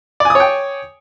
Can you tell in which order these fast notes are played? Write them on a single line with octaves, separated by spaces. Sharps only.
D5 G#5 D#6 C#5 G5